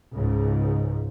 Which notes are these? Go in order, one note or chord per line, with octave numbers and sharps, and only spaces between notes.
C#2 G#2